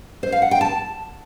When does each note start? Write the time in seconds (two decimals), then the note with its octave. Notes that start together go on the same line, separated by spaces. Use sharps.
0.23 C5
0.32 F5
0.42 F#5
0.51 G5
0.61 A5